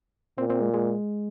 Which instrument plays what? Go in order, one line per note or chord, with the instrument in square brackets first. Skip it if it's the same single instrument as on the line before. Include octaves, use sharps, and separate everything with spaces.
[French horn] A#2 [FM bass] C4
[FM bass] C4
G#3
G#3